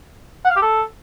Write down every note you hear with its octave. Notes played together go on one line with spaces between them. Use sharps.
F#5
F5
G4
A4